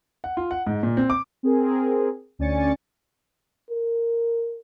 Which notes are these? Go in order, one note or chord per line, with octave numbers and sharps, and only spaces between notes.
F#5
F4
F#5
G#2
A#2
C4
D6
C4 G#4 A#4
D2 C#4 D5 G#5 A6 C#7
A#4